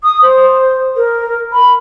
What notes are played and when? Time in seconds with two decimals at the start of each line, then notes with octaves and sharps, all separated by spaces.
0.03 D#6
0.22 C5
0.96 A#4
1.52 B5